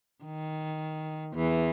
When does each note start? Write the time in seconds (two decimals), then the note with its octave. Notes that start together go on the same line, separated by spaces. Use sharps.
0.24 D#3
1.34 E2 E3